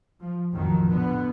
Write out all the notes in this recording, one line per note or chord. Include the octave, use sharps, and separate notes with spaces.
F3
A1 F2 A2 D#3 F3 F#3
B2 D3 B3